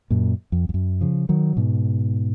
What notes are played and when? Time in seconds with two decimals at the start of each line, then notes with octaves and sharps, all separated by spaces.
0.10 F#2 A#2
0.52 F2
0.69 F2
0.74 F#2
1.01 C#3 F3
1.29 D#3 F#3
1.57 G#2 B2